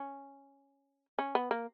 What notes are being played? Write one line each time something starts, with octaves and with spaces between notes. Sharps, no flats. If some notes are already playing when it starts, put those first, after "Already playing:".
Already playing: C#4
C#4
B3
A#3